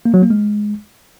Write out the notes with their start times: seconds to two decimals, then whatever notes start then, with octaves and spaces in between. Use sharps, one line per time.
0.05 A#3
0.14 F#3
0.22 A#3
0.30 G#3